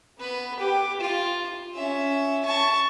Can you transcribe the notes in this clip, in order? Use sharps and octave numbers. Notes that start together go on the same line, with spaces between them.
B3 B4
G4
F4
C#4 E5
A5 C#6